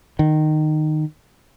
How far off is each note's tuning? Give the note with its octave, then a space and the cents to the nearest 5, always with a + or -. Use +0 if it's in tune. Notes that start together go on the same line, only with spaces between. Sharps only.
D#3 -15